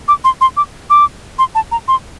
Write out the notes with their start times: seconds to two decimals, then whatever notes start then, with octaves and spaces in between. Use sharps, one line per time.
0.08 D6
0.24 C6
0.41 C6
0.57 D6
0.90 D6
1.39 C6
1.55 A5
1.72 A#5
1.88 C6